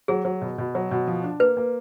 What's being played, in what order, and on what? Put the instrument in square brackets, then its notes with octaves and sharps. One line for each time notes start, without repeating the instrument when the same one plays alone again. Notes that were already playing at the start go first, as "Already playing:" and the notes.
[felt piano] F#3 [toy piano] G#4
[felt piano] F#3
B2
B2
F#3
B2
F3
D4
[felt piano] A#3 [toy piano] B4
[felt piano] A#3